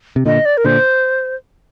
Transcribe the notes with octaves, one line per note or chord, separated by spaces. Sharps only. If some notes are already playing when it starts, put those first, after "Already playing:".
C3
A#2 D3 D#5
D5
A#4
A#2 D3 C5